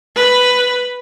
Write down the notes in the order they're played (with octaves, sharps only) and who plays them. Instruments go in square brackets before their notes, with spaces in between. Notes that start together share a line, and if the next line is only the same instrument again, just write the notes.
[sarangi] B4